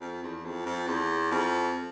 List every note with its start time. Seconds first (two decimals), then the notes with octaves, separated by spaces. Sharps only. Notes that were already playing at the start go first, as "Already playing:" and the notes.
0.01 F2
0.23 E2
0.45 F2
0.66 F2
0.87 E2
1.31 F2